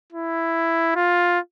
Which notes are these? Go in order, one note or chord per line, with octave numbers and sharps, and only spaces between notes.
E4
F4